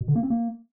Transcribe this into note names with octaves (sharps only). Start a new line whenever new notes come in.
B2
D3
A#3
C4
A#3